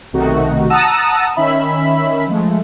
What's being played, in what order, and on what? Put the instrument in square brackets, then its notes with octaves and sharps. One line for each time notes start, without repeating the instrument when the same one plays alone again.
[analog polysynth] B1 C3 D#3 A3 D#4 F#4
F#5 A5 A#5 D#6 E6
D#3 C#4 E5 B5
F3 G#3 A3